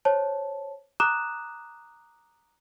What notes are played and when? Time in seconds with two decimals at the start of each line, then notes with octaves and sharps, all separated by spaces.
0.05 C5 C#5 A5
1.00 A#5 D6 D#6 F#6 E7